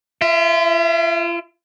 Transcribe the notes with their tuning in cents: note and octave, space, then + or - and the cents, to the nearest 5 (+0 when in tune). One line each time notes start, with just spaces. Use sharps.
F4 -40 E5 +0